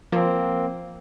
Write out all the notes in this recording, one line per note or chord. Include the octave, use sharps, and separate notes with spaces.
F3 A#3 C4